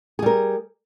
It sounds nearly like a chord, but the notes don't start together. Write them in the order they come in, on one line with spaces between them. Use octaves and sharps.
G#4 G3 A#4